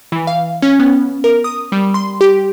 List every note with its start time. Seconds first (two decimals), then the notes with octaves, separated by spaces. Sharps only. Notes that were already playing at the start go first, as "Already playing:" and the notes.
0.12 E3
0.27 F5
0.62 C#4
0.79 B3
1.24 A#4
1.44 D#6
1.72 G3
1.94 C6
2.21 G4